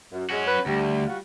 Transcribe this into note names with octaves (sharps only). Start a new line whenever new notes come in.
F#2
G#3 C#4 F#4
B4
D2 G3
G3 F4 F#4